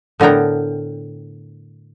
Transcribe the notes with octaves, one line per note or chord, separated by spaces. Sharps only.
A2 D3 B3 A#4 G5